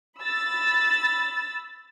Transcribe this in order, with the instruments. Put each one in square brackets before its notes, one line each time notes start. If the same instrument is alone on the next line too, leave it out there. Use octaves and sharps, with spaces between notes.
[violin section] B5 E6 A6